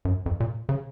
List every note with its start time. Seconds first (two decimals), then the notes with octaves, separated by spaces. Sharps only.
0.05 F#2
0.26 F2
0.40 A#2
0.69 C#3